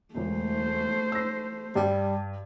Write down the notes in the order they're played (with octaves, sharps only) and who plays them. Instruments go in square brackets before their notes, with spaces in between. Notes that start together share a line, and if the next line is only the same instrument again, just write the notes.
[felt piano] E1 D2 [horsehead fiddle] A3 C5
[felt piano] E6 A#6
[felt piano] G2 [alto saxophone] G3